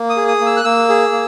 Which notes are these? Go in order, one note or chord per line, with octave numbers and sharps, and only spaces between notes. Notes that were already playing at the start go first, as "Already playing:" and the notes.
Already playing: A#3
D#6
G#4
D#6
A#3
E6
F#6
A#3 E6
G#4
A#3